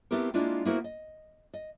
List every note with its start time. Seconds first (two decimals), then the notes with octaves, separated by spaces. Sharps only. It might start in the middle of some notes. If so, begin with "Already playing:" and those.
0.11 A3 B3 C4 E4 G4 A#4
0.34 G#3 A#3 D4 E4 F4
0.65 A#3 B3 E4 F#4 A#4 C5
0.84 D#5
1.54 D#5